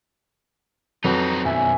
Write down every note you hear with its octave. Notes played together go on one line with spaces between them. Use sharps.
F2 F#3 C4 D#4 B4 A5 A#5
B1 F#2 E5 G#5